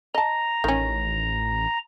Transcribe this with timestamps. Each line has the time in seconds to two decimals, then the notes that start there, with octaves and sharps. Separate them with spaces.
0.15 D#5 A5 A#5
0.64 A1 D#3 C#4